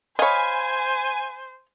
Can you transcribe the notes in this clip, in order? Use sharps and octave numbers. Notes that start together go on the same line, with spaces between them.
C5 C#5 D#5 F5 G#5 B5